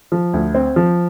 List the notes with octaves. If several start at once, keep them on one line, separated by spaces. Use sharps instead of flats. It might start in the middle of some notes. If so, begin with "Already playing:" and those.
F3
D2
C4
F3